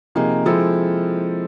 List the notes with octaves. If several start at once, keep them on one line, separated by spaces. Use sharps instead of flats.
C3 F3 A#3 D#4 G#4
F3 G#3 C4 E4 A4